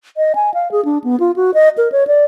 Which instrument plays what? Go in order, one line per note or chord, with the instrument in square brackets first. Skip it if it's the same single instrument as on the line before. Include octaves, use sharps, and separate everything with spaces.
[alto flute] D#5
G#5
F5
G#4
D4
B3
F4
F#4
D#5
A#4
C#5
D5